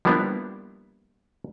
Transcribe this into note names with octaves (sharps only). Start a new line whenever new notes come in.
F3 G3 A#3 B3 D4 E4